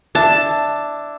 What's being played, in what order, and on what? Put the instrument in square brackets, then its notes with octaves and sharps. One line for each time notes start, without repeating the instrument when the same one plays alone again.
[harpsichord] D4 E4 [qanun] A5